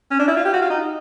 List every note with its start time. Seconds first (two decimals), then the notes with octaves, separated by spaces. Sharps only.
0.11 C#4
0.19 D4
0.28 E4
0.37 F4
0.45 G4
0.53 F#4
0.61 F4
0.70 D#4